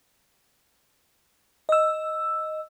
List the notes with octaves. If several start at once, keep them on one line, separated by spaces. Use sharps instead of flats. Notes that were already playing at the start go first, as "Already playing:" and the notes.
D#5 E6